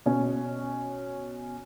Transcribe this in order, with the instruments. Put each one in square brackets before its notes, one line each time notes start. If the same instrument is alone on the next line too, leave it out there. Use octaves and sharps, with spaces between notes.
[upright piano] B2 C#4